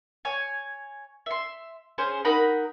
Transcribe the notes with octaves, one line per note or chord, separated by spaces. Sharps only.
C#5 G#5
E5 C6
C#4 G#4 C5
D#4 A#4 F#5 B5